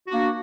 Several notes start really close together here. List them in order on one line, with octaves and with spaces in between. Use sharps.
F#4 D4 A#3